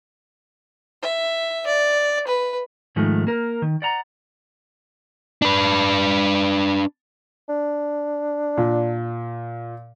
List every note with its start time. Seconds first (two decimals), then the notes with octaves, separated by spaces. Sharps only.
1.02 E5
1.67 D5
2.27 B4
2.96 G#2 D#3 F3 G#3 A3
3.27 A#3 A#4
3.62 D#3
3.82 D5 F#5 A#5
5.42 D4 B4
7.49 D4
8.57 A#2